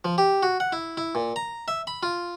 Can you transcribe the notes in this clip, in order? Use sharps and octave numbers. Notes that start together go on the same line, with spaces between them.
F3
G4
F#4
F#5
E4
E4
A#2
A#5
E5
B5
F4